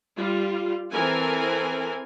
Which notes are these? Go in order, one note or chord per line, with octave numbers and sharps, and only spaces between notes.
G3 F4
E3 C4 A4 A#4 G#5